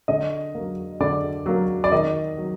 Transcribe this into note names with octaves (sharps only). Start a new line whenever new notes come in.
D3 D#5
F#3 A#3
D3 D5
F#3 A#3
D5
D#3 D#5
F#3